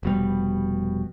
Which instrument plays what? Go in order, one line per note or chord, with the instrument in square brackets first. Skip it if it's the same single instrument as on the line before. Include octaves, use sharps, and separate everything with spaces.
[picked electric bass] F1 B2 G3